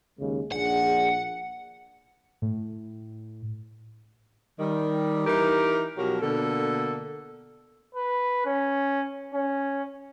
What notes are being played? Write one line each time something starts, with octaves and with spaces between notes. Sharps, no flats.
D#2 C#3 G#3
A#1 D4 G#4 F#5
A2
D#3 G3
E3 D#4 G4 A#4
B2 F3 F#3 F#4 G4 A#4
B2 D3 A#3 A4
B4
C#4
C#4